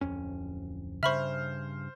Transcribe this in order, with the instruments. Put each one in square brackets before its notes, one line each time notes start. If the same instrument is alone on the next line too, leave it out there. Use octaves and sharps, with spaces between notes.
[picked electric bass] D1 F2 C#4
[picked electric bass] G2 C#3 [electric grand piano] C5 F6 [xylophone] E5 B5 C#6